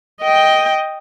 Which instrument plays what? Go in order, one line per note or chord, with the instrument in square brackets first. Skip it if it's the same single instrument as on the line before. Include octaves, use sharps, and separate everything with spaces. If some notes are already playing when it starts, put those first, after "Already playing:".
[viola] D#5 G5